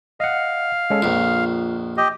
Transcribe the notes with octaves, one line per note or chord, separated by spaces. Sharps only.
D#5 F5 F#5
G#3 C#4 A4
A#1 F2 F4
G4 D#5